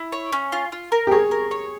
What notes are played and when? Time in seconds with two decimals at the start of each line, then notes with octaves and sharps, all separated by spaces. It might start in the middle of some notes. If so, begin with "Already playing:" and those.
Already playing: E4
0.12 C#5
0.32 C#4
0.52 F4
0.72 F4
0.92 A#4
1.07 G4
1.11 G#4 C#5
1.31 A#4
1.51 C#5